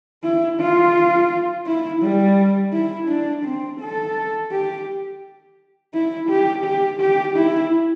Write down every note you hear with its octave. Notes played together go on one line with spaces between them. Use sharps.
E4
F4
E4
G3
E4
D4
C4
A4
G4
E4
G4
G4
G4
E4